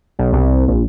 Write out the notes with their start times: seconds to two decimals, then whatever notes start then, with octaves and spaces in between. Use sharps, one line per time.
0.19 B1
0.33 C2
0.68 A#1